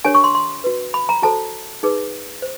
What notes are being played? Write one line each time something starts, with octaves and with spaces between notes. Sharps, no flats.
D4 G4 A#4 C#5 G#5
C#6
C6
C6
F#4 B4
B5
A#5
F#4 A4 C5 A5
D#4 G#4 B4
C5